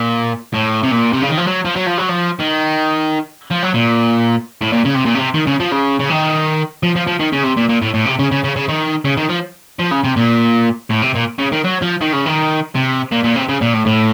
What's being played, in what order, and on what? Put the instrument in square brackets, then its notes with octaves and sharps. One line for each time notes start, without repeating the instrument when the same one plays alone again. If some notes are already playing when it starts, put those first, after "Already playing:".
Already playing: [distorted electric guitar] A#2
A2
C3
A#2
C3
C#3
D#3
F3
F#3
F3
F#3
F3
F#3
F3
D#3
F3
F#3
A#2
A2
A#2
C#3
C3
A#2
C3
D#3
C#3
F3
C#3
C#3
D#3
F3
F3
F3
D#3
C#3
C3
A#2
A#2
A2
A2
C3
C#3
C#3
C#3
C#3
D#3
C#3
D#3
F3
F3
C#3
C3
A#2
A2
C3
A#2
C#3
D#3
F#3
F3
D#3
C#3
D#3
C3
A#2
A#2
C3
C#3
A#2
A2
A2